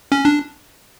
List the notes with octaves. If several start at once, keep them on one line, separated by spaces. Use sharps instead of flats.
C#4
D4